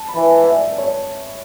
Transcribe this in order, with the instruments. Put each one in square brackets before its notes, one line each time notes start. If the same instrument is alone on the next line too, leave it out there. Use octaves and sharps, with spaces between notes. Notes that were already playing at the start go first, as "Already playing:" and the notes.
Already playing: [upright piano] A5
B5
[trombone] E3
[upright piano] G#5
E5
D5
C#5